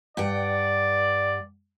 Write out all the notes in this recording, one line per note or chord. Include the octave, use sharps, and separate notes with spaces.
G2 D5 F#5 G5